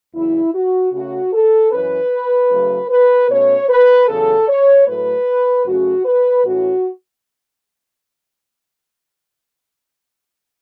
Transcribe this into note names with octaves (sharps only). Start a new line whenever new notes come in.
E2 C#3 F#3 E4
F#4
C#3 A3 C#4 F#4
A4
F#2 E3 C#4 B4
C#3 F#3 A3 C#4
B4
B2 A3 C#4 C#5
B4
E2 C#3 F#3 A4
C#5
A2 F#3 A3 B4
F#2 C#3 A3 C#4 F#4
B4
A2 E3 C#4 F#4